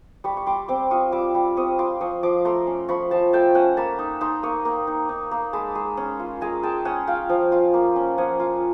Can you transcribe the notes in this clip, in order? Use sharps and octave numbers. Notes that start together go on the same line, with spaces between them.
G3 B5 C#6
C#6
G3 C6 D6
C4 C6 D6
F4 C#6 D#6
G3 D6 E6
G3
C4 C#6 D#6
F4 C6 D6
F3 C#6 D#6
F3 C6 D6
A3 A#5 C6
C#4
F3 B5 C#6
F3 G5 A5
A3 G5 A5
C#4 F#5 G#5
A#3 A5 B5
D#4
D#4 A#5 C6
A#3 C#6 D#6
A#3
D#4
D#4
A#3
G#3 A5 B5
G#3
C#4
F4
G#3 G#5 A#5
G#3 G5 A5
C#4 F#5 G#5
F4 F5 G5
F3
F4
A#3
C#4
F3 F#5 G#5
F4